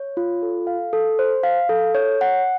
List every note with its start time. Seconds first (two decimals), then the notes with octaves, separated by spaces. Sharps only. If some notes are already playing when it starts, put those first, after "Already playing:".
Already playing: C#5
0.17 F4
0.42 A4
0.67 F5
0.93 A4
1.19 C5
1.43 F5
1.69 A4
1.95 C#5
2.21 F#5